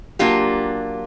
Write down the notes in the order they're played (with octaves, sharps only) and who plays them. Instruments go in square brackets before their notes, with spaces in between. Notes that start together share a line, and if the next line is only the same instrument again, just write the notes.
[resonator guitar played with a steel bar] F#3 A#3 D4 F4 G4